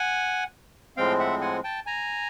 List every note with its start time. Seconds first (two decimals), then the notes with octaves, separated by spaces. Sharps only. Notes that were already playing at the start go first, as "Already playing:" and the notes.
Already playing: F#5 G#5
0.97 A2 F3 G#3 C4 F5 G5
1.19 E5 F#5
1.41 F#5 G#5
1.64 G5 A5
1.86 G#5 A#5